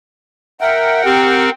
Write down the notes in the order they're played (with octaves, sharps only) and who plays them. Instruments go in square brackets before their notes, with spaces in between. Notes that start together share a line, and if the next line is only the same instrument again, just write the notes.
[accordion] A#4 F#5 G5 [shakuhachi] E5
[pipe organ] C4 [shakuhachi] G4